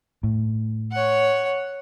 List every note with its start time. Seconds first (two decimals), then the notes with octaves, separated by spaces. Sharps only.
0.23 A2
0.92 C#5 F#5